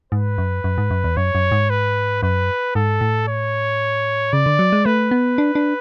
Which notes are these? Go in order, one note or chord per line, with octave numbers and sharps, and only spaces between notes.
G#2 B4
F#2
F#2
G#2
F#2
E2
F#2 C#5
F#2
G#2
B4
F#2 B4
G#2 A4
A2
C#5
C#3 D5
D3
F#3
G#3
A3 B4
B3
D4
D4